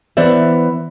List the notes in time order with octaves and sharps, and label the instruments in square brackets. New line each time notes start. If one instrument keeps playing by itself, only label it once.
[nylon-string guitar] E3 B3 C5 D5 E5